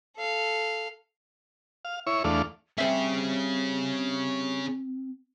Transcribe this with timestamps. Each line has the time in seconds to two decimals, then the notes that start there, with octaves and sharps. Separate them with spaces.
0.16 A4 F5
1.85 F5
2.07 E4 C#5
2.24 E2 A3 D4 F5
2.78 G3 C4 C#4 G#4 C5 E5